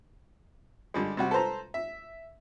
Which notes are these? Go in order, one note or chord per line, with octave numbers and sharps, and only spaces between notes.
D3 G3 G#3
C3 G3 F#4
A4 B4 C5 A#5
E5